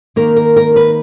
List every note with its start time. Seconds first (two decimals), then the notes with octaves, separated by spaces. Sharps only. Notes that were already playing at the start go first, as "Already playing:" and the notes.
0.16 D#3 A#3 A#4
0.36 A#4
0.56 A#4
0.76 B4